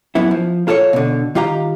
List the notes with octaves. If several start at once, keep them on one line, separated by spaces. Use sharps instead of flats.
F#2 B3 E4
F3
A#3 F4 A4 C5 C#5
B2 D3
D#3 F4 G4 F5 A#5